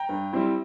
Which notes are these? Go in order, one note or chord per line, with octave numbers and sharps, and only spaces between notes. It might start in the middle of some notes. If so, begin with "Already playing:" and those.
Already playing: G5 A#5
G2
G3 C4 E4